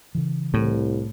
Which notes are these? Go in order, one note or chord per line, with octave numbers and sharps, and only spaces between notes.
C#3 E3
C2 A2